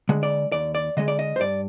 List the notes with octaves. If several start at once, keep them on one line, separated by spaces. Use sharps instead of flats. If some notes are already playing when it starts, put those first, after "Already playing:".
D3 G#3
D5
D#2 D5
D5
D3 G#3 D#5
D5
D#5
C5
G2 D5